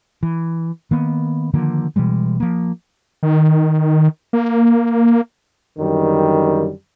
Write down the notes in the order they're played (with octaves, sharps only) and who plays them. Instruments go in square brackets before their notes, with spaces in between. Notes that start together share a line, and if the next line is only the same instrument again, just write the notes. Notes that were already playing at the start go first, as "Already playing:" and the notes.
[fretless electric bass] E3
D#3 A#3 B3
D3 D#3 F3 A#3
B2 E3 G3 G#3
F3 A#3
[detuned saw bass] D#3
A#3
[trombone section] F#2 D3 D#3 G3